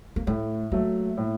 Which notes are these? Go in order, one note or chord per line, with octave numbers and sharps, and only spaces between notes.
A#3
A2 A3
F#3 A3 A#3
A2